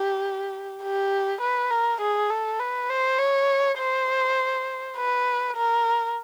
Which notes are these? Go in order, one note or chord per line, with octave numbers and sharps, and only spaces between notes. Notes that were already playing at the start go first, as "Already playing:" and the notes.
Already playing: G4
G4
B4
A#4
G#4
A4
B4
C5
C#5
C5
B4
A#4